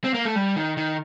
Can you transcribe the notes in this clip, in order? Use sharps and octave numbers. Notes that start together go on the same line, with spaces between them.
C4
A#3
A3
G3
D#3
D#3